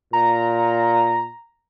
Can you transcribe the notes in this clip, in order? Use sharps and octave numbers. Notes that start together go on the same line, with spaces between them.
A#2 A#5